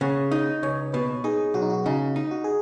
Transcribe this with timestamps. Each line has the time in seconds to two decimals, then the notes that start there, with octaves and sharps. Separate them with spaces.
0.01 C#3 F#5
0.31 D#4 D#5
0.63 C#2 C#5
0.93 B2 B4
1.24 D#4 G#4
1.54 B1 F#4
1.62 D#4
1.70 F#4
1.86 C#3 D#4
2.16 D#4
2.31 F#4
2.44 G#4